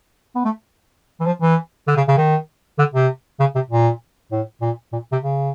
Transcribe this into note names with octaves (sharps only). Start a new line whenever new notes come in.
B3
A3
E3
F3
E3
D3
C#3
C#3
D#3
D3
C3
C#3
C3
A#2
A2
A#2
A#2
C3
C#3